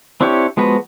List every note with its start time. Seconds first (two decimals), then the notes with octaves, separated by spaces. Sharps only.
0.21 C4 D4 E4 G4 C#5
0.57 F3 G#3 B3 F#4 B4